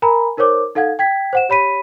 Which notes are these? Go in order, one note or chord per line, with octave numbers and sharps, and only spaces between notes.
A#4 G#5 A#5 B5
D#4 A#4 C5 C#5 D6
D#4 A4 F5 F#5 G#6
G5 G#6 B6
C5 F#5 E7
G4 C#5 B5 B6 D#7